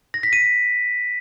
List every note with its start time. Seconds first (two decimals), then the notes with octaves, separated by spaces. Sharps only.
0.14 A#6
0.23 B6
0.33 D#7